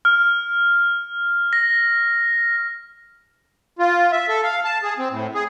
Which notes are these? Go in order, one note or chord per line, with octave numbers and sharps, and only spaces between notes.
F6
A#6
F4
E5
A4
F5
A5
G#4
C4
A2
G#4